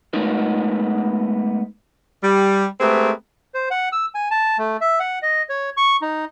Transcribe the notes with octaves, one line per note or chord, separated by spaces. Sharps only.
G#3 A3 B3 D#4 A#4
G3
G#3 A3 B3 C4 G4 A#4
C5
F#5
E6
G#5
A5
A3
E5
F#5
D#5
C#5
C#6
D#4